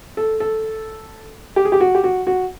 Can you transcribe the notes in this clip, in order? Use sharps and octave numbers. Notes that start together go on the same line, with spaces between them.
A4
A4
G4
G#4
G4
F#4
G4
F#4
F#4